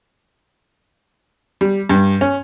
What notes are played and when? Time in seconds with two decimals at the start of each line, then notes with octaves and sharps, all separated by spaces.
1.61 G3
1.90 G2
2.21 C#4